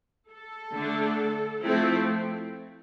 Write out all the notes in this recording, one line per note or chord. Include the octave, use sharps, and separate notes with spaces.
A4
D3 A3 D4
F3 A3 C4 E4